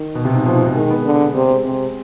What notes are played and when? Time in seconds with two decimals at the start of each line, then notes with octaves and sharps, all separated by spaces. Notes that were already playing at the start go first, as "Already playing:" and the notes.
Already playing: D#3
0.15 B2
0.25 C3
0.35 G#2
0.45 B2 F3
0.55 G#2
0.66 B2
0.75 D#3 G#3
0.90 B3
1.05 D3
1.34 C3 C4
1.50 G#3
1.65 C3 G#3